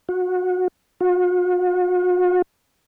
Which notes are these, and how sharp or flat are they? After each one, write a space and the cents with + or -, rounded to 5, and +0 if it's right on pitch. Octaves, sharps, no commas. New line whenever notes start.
F#4 -25
F#4 -45